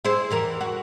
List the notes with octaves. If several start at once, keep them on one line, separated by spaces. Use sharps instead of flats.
E4 G#4 C5
E2 E3 A#4
F#4